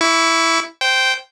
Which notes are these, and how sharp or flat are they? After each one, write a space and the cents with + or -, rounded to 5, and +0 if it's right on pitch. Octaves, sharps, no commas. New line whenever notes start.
E4 +0 C#6 +30
C5 +0 G5 -10